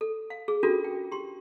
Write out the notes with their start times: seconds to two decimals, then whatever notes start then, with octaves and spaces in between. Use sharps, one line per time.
0.01 A4
0.30 F5
0.48 G#4
0.63 C#4 D4 F4 F#4 A4 A#4
0.84 G5
1.11 G4 C6